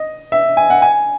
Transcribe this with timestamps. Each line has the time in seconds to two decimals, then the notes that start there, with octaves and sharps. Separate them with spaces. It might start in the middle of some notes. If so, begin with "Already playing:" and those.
Already playing: D#5
0.32 E5
0.57 G#5
0.70 F#5
0.82 G#5